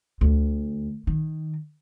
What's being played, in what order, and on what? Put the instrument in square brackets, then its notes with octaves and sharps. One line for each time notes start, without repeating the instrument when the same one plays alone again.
[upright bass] D2
D#3